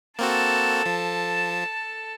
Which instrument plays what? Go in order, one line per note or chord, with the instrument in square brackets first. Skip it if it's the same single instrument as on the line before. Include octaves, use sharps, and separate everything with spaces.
[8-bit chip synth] A#3 C4 F#4 [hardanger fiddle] A4 A5
[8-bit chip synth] F3